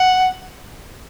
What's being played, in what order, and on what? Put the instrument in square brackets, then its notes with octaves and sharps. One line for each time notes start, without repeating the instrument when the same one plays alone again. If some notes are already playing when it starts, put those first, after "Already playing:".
Already playing: [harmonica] F#5